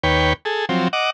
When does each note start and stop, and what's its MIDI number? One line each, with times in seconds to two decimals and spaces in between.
0.03 0.33 39
0.03 0.33 71
0.03 0.33 73
0.03 0.33 79
0.45 0.66 68
0.45 0.66 69
0.69 0.88 53
0.69 0.88 54
0.69 0.88 60
0.93 1.10 75
0.93 1.10 78
0.93 1.10 86